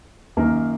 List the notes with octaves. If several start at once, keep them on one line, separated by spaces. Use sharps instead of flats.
F#2 D#3 A#3